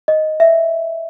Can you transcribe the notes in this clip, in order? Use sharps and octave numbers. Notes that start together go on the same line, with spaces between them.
D#5
E5